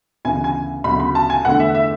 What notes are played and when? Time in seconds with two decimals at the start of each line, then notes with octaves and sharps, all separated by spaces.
0.25 D2 C#3 E3 B3 G#5
0.44 G#5
0.84 D2 C#3 F#3 B3 B5
1.00 B5
1.15 A5
1.30 G#5
1.45 E2 D3 A3 F#5
1.60 E5
1.75 E5